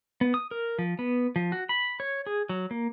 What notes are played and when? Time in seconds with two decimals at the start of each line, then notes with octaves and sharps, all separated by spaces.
0.21 B3
0.34 D#6
0.51 A#4
0.79 F3
0.99 B3
1.36 F3
1.52 F#4
1.69 B5
2.00 C#5
2.26 G#4
2.49 F#3
2.71 A#3